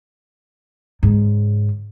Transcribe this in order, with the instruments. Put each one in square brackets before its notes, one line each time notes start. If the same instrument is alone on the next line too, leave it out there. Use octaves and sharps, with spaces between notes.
[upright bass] G#2 C#3